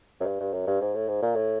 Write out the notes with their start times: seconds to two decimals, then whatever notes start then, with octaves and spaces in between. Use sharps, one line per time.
0.21 F#2
0.26 G2
0.41 G2
0.53 F#2
0.67 G2
0.81 G#2
0.95 A2
1.08 G#2
1.22 A#2
1.36 A2